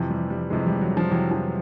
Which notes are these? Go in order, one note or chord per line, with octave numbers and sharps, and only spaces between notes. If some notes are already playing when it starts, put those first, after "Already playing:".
Already playing: F2 C3 E3
G3
G3
F2 C3 E3 G#3
G3
F#3
F3
F2 C3 E3 F#3
F3